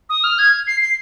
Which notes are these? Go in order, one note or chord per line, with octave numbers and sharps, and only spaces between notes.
D#6
F6
G#6
C7
C7